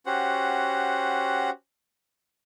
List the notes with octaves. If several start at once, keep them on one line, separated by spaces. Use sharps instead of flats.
C#4 F#4 G4 C5 F#5